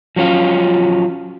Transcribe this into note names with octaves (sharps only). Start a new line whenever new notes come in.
F3 F#3 C#4 F4